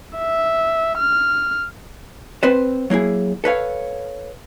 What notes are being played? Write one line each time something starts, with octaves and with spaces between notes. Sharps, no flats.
E5
F6
C4 B4 C5
F#3 A#3 E4 G#4
A4 B4 C#5 F5